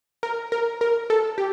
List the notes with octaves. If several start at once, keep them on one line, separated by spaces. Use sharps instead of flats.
A#4
A#4
A#4
A4
G4